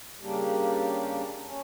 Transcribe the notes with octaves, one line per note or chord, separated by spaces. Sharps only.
C#3 G3 A#3 D4 G4
C#4